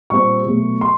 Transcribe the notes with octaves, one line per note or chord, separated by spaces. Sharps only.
A#2 G3 C4 C#6
B2 F#3 A3
C6